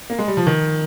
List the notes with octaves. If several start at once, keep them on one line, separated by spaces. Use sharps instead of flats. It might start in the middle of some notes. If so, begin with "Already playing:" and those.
A#3
G#3
G3
F3
D#3